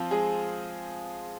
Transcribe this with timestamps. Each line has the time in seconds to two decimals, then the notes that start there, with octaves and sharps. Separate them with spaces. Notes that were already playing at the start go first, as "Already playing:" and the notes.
Already playing: F3 C4 F4
0.11 G#3 G#4